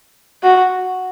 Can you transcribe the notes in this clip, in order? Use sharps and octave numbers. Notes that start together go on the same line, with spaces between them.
F#4